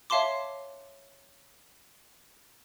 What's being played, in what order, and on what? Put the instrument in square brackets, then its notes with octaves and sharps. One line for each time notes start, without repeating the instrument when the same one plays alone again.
[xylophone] C#5 E5 F5 A5 C6 D6